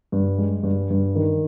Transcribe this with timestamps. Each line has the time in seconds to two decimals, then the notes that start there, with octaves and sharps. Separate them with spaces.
0.12 G2
0.38 G#3
0.63 G2
0.90 G2
1.15 D#3